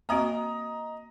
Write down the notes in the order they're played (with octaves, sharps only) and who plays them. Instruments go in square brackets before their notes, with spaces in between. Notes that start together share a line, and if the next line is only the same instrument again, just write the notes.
[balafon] A#3 C4 F#4 [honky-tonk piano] D#5 A#5